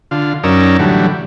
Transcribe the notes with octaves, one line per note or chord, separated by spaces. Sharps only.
D3 F4
F#2 C#4 D#4 A#4 D5 E6
A2 D3 E3 F#3 G3